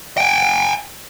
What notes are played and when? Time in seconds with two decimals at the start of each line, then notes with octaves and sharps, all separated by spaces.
0.18 G5 G#5